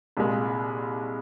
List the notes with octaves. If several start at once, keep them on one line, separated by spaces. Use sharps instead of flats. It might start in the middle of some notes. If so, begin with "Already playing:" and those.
C2 A#2 G#3